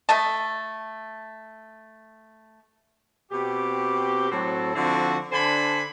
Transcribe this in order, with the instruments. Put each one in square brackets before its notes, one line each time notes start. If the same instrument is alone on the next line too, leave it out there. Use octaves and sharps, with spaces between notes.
[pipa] A3 A4 D#5 A5
[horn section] B2 C4 G4
A2 F#3 C4 F#4 A4
D3 F3 C4 E4 F#4
D3 D4 C5 G#5 B5